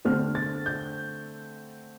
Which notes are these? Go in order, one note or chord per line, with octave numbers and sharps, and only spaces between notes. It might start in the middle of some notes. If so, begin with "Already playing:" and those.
D3 A3 C4 F6
A6
G6